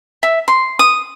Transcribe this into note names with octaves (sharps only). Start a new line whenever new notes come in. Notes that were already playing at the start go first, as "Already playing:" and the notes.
E5
C6
D#6